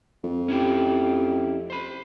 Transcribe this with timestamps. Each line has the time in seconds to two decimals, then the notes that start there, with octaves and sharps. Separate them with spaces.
0.24 F2
0.48 C#4 E4 G4
1.70 C5 B5